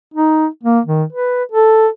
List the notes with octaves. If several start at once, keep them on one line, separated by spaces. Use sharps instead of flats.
D#4
A#3
D#3
B4
A4